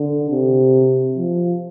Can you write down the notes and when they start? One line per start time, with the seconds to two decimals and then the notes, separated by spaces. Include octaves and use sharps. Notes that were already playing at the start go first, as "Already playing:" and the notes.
Already playing: D3
0.30 C3
1.17 F3